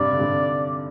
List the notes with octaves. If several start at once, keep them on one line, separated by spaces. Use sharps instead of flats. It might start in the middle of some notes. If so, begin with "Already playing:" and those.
Already playing: G2 C3 D5
D3
G2 C3